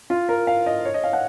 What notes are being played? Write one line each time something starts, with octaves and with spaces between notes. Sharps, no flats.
F4
A#4
F5
D#5
C#5
D#5
F5
F#5